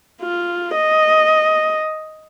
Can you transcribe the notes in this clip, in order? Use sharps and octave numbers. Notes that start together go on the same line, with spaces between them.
F4
D#5